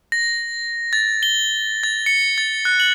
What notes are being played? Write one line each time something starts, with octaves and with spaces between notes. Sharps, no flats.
A#6
A6
G7
A6
C#7
A6
F#6
F#7